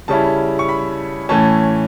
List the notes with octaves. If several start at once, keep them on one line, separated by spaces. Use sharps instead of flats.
C#3 G3 C#4 E4 A5
C#6
B5
A2 E3 A3 C#4 A5